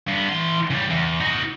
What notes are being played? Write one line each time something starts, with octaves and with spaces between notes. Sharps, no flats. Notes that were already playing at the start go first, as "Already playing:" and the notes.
G2 B3
E3 C6
C#3 G3
E2
D#4 F#4